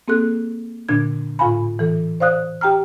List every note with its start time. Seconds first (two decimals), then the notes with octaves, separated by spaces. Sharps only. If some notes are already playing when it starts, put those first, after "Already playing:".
0.08 A#3 C4 G#4 A4 F#6
0.89 A#2 D3 D4 G#6
1.39 A2 F4 F5 G#5 B5
1.79 E3 A4
2.20 C5 D5 F5 D#6 F#6
2.61 G4 G5 A#5 F6